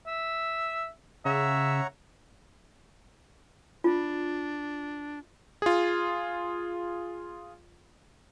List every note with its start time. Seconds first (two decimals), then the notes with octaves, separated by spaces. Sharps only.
0.07 E5
1.25 C#3 C#5 E5 F#5 A#5
3.84 D4 F4
5.62 F4 G#4